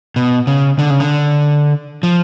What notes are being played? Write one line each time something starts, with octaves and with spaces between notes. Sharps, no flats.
B2
C#3
D3
C#3
D3
F3